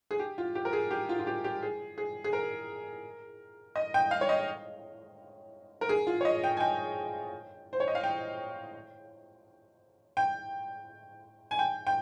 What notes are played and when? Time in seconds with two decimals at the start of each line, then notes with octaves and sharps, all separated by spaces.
0.11 G#4
0.19 G4
0.38 F4
0.55 G4
0.65 A#4
0.73 G#4
0.91 G4
1.09 F4
1.19 F4
1.27 G4
1.44 G4
1.63 G#4
1.98 G#4
2.24 G#4
2.33 A#4
3.76 D#5
3.94 G5
4.11 F5
4.21 C#5
4.29 D#5
5.81 A#4
5.89 G#4
6.07 F4
6.21 C#5
6.25 D#5
6.44 G5
6.57 G#5
6.60 G5
7.73 C5
7.80 C#5
7.88 D#5
7.95 F5
8.03 G5
10.17 G5
11.51 G#5
11.59 G5
11.87 G5